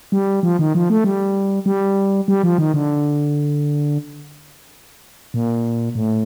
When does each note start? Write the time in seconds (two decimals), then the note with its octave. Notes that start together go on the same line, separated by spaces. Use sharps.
0.12 G3
0.43 F3
0.59 D#3
0.75 F3
0.90 A3
1.04 G3
1.66 G3
2.28 G3
2.43 F3
2.58 D#3
2.74 D3
5.34 A#2
5.95 A2